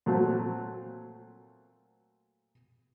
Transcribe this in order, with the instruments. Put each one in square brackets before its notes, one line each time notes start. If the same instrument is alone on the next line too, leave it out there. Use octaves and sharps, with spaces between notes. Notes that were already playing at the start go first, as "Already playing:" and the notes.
[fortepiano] A#2 F#3 A3 C4